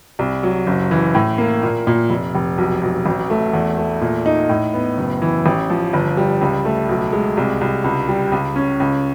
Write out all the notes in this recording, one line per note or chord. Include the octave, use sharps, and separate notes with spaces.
C2
F#3
F#1
E3
A2
A#3
A#2
A#2
F1
F1
B1
B1
A1
A3
E2
A3
A#2
D#4
A2
B3
F#1
E3
A1
F3
G1
G3
C#2
A3
B1
G#3
C2
C2
C#2
G3
C#2
C#4
C#2